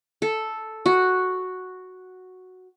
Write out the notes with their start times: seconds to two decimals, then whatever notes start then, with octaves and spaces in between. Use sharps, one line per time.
0.22 A4
0.86 F#4